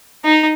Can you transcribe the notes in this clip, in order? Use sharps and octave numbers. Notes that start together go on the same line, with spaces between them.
D#4